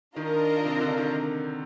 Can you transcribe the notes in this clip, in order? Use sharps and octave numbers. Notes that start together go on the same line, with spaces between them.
D#3 D4 F4 A#4 D#5
C3
D3
D#3